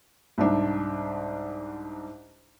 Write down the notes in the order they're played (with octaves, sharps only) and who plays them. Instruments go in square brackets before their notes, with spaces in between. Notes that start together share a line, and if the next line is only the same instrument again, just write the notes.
[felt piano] C2 G#2 D4